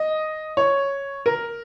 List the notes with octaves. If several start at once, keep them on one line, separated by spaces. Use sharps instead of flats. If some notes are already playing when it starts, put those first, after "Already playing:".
Already playing: D#5
C#5
A#4